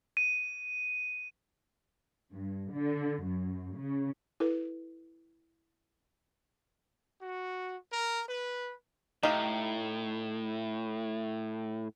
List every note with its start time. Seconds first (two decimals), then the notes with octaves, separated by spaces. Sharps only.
0.17 D#7
2.32 G2
2.73 D3
3.24 F#2
3.77 C#3
4.40 E4 A4 B4
7.22 F#4
7.93 A#4
8.28 B4
9.23 A2 D#4 G4 F5